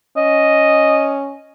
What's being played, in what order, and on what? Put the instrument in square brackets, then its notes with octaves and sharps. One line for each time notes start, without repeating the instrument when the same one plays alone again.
[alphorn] C#4 [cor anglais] D#5